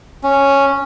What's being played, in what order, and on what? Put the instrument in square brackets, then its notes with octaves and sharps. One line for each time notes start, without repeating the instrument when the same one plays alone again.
[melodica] C#4